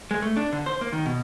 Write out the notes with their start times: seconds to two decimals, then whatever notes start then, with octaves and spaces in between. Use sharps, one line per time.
0.11 G#3
0.22 A3
0.36 D4
0.53 D3
0.66 C5
0.81 A#3
0.93 D#3
1.05 B2